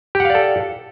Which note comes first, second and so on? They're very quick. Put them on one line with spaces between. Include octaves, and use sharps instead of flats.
G4 F#5 F5 D5 A4